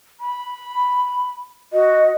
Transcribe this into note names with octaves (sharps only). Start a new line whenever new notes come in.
B5
F#4 D#5